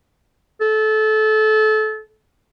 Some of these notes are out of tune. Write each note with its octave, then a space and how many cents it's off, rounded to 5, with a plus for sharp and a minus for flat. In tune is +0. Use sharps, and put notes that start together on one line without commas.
A4 -25